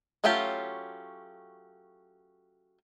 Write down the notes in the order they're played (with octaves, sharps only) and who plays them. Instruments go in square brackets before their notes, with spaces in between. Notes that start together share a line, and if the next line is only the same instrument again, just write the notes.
[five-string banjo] F#3 A3 C#4 F4 G4